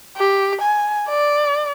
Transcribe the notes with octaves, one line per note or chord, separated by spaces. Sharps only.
G4
G#5
D5